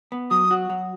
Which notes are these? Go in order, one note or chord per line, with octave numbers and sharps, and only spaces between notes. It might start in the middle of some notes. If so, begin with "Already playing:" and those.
B3
F#3 D#6
F#4
F#3